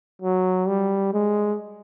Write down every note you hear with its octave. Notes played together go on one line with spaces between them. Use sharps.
F#3
G3
G#3